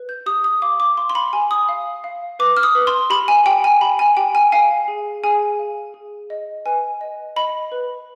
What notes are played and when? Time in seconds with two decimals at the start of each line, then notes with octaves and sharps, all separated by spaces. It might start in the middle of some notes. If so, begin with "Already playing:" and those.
Already playing: B4
0.09 G6
0.26 G4 D#6
0.44 D#6
0.62 F5 D6
0.80 D6
0.97 F5 C6
1.10 C6
1.15 B5
1.33 G4 G#5
1.51 D#6
1.69 F5
2.04 F5
2.39 B4 D6
2.57 F6
2.63 D#6
2.75 B4
2.87 C6
3.10 G4 B5
3.28 G#5
3.46 G4 G5
3.64 G#5
3.81 G4 B5
3.99 G#5
4.17 G4 G5
4.35 G#5
4.52 F5 G#5
4.88 G#4
5.24 G#4 G#5
5.59 F5
5.94 G#4
6.30 D#5
6.66 B4 G#5
7.01 D#5
7.36 D#5 B5
7.72 B4